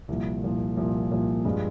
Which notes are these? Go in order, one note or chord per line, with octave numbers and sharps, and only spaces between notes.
C2 A#2 F3
C2 A#2 F3
C2 A#2 F3
C2 A#2 F3
G2 F3 G#3